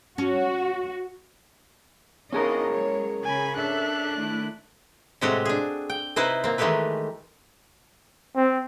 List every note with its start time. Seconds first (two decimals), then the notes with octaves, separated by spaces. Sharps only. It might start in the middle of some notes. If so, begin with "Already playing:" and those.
0.18 C#4 F#4
2.33 C4 C#4 D#4 G#4 A#4 D#5
2.72 F#3 G#3 C#5
3.24 C#3 G#5 B5
3.56 D4 A4 E5 F#6
4.16 D#3 A3 E4
5.21 A2 C3 G#3 C4 F#4 G4
5.45 D4 G#4
5.90 G5
6.16 C3 D#4 E4 B4 C5 D#5
6.44 A#3 C4
6.58 D#3 E3 G#3 A3 G4 B4
8.36 C4